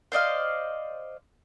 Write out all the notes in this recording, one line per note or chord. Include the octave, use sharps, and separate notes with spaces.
C5 D5 D#5 F5